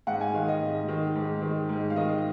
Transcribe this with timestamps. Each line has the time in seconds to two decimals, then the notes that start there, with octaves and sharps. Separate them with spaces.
0.07 G#2 F#5
0.21 G#5
0.34 D#3 F5
0.48 D#5
0.62 G#2
0.88 D#3
1.16 G#2
1.42 D#3
1.69 G#2
1.90 F5
1.96 D#3 D#5